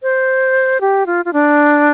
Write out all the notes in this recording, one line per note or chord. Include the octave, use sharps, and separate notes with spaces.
C5
G4
F4
F4
D4